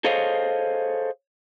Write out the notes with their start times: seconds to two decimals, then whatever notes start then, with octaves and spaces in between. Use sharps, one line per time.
0.04 G#4 A4 C5 C#5 D#5 F5